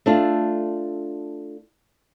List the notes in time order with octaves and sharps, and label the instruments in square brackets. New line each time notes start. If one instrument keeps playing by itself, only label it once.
[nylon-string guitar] A3 D4 F4